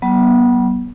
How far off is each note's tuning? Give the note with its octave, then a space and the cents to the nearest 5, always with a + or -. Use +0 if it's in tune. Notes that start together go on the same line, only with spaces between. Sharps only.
F#3 +40 B3 -30